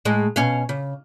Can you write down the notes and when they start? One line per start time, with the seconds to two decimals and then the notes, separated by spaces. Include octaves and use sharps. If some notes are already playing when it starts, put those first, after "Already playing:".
0.05 A2 G#3
0.36 B2 C#4 F5
0.69 C#3